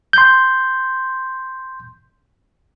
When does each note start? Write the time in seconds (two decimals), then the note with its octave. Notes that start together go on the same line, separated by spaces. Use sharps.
0.13 C6 G6